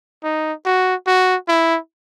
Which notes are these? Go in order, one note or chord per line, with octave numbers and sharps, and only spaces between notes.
D#4
F#4
F#4
E4